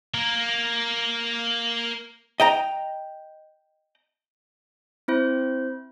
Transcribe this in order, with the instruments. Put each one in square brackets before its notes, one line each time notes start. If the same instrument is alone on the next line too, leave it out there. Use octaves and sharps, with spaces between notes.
[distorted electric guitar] A#3 A#4
[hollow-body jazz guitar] D#5 G5 A#5
[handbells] C4 E4 C5